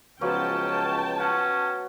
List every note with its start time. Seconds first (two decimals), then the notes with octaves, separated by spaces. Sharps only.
0.21 C#2 F3 F#3 B3 C#4 G5 A5
1.20 C#4 F#5